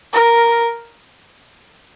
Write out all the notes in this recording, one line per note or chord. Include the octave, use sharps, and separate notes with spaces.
A#4